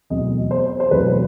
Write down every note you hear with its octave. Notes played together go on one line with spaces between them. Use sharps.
E2 B2 F#3 A3 C4 D#5
C5
C5
E2 B2 F#3 A3 C4 B4